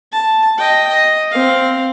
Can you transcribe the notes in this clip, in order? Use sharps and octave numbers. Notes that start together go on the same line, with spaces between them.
A5
D#5 G5
D#5
C4 F5